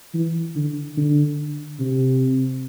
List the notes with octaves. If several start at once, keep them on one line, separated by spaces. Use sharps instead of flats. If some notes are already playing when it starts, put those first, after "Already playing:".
E3
D3
D3
C3